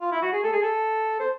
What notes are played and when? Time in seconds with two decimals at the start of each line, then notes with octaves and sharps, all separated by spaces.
0.01 F4
0.12 E4
0.22 F#4
0.33 G#4
0.44 A4
0.53 G#4
0.63 A4
1.20 C5